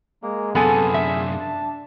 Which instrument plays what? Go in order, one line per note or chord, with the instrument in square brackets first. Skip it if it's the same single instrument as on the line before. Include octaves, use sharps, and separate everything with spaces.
[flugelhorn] G#3 [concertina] A#3
[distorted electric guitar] F#2 C3 [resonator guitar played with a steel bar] B3 G#5 [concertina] F4 G#4 [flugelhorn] A4
[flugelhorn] D4 [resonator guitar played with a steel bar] E5
[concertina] A5